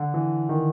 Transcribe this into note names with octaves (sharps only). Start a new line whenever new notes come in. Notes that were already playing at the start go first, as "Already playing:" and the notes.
Already playing: D3
E3
D#3